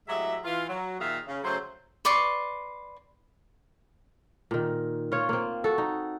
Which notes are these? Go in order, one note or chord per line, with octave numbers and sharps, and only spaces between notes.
A2 F#3 G#3 G4 E5
E3 F4
F#3
A#2 D#3 F4 G#4 E5 F5
C#3
C#3 F#3 A3 C#4 C5
B4 D5 C6 C#6
A#2 D#3
F4 C#5
A#3 C4
F#4 A4
D#4